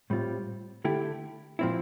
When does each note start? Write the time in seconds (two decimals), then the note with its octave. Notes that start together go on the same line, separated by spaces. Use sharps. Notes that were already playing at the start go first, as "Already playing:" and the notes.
0.10 A2 G3 C4 F4
0.84 D3 A3 E4 G4
1.59 A#2 F3 C4 E4